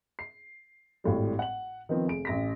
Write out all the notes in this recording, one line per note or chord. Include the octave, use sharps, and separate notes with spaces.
C7
G#1 A2 G3
F#5 F#7
D#3 F3 B3 C4
F1 G#4 D7
A1 A#6 B6